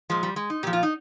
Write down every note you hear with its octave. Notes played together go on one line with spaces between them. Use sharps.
A#2 F3 G#3
G3
G#3
D#4
A#2 F3 G4
F4
D#4